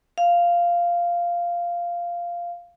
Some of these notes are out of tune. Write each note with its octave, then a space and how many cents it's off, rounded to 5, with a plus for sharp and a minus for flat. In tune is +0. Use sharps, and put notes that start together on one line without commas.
F5 -5